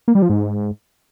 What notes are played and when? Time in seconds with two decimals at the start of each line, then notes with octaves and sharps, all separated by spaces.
0.08 A#3
0.15 G3
0.22 F3
0.30 G#2